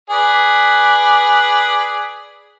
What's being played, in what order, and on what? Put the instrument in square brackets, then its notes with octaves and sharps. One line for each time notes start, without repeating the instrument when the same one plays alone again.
[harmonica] G#4 B4 D5